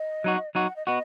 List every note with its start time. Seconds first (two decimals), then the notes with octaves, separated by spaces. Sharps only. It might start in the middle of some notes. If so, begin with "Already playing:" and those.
Already playing: D#5
0.24 F#3 D#4 F#4
0.55 F#3 D#4 F#4 F#5
0.66 F#5
0.76 D#5
0.86 B3 F#4 D#5